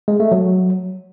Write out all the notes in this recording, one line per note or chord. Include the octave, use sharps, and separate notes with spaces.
G#3
A3
F#3